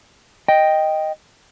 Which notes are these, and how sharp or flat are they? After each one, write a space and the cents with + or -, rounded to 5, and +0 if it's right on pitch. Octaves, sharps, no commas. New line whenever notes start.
D#5 +0 G5 +0